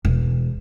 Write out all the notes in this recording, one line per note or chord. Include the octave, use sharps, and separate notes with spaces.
E1